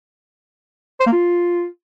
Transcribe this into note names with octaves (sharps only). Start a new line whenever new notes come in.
C5
A#3
F4